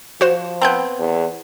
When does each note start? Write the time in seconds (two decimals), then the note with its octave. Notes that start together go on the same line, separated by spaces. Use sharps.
0.21 F3 F#4 C5 E7
0.62 B3 C4 A5 F#6 G6
0.99 E2